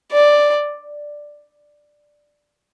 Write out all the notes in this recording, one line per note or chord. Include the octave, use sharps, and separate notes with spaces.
D5